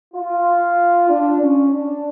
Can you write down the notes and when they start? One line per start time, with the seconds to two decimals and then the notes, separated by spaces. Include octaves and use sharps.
0.15 F4
1.09 D4
1.41 C#4
1.72 D4